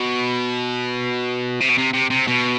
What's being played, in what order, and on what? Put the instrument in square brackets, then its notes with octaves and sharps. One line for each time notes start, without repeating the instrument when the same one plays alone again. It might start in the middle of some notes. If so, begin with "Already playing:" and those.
Already playing: [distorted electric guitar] B2
C3
B2
C3
C3
C3
B2